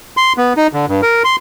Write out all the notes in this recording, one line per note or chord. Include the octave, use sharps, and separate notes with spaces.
C6
B3
D#4
D3
G2
A#4
C6